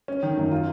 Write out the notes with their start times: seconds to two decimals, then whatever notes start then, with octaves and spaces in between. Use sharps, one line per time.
0.08 C#4
0.23 D#3
0.37 F#2
0.51 F4